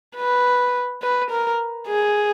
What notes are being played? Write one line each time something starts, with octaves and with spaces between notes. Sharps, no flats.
B4
B4
A#4
G#4